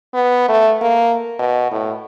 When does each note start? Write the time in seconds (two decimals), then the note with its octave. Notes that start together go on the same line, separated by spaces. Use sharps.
0.14 B3
0.49 A3
0.82 A#3
1.39 B2
1.71 A2